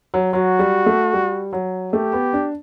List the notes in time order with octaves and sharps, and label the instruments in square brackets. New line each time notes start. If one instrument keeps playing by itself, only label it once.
[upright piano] F#3
[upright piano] F#3 [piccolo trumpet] F#4
[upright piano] G3
A3
G3
F#3
[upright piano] A3 [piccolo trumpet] G4
[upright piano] B3
D4